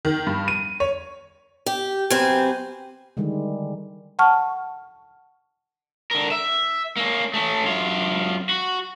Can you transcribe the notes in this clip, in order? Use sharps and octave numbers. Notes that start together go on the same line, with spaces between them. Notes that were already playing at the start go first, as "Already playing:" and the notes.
D#3
G2
D#7
C#5
G4
F#2 C3 C4 B4 C5 G#5
D3 D#3 G3 G#3
F#5 A5 C#6 F6
D3 A#4
E5
A#3 C#4
A3 C#4
F#2 F4
F#4